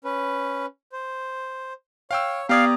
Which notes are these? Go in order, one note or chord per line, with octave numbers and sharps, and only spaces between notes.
C#4 B4
C5
C#5 F5 G5 E6
B3 G4 D5 F5 A#5 D#6 G#6